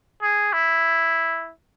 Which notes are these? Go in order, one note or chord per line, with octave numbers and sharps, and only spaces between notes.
G#4
E4